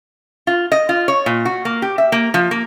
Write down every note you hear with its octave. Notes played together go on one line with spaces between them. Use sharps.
F4
D#5
F4
C#5
A#2
F#4
A#3
G4
E5
A#3
F3
A#3